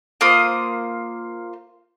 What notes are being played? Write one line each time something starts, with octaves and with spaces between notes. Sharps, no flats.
A#3 F4 C5 D#6